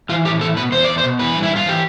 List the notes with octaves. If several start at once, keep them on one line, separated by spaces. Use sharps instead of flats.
E3 F4
A2 G4
E3 A4
B2 B4
E2 C5
E2 D5
C5
B2
E3 B4
G2
E4
G2
F4
E3 G4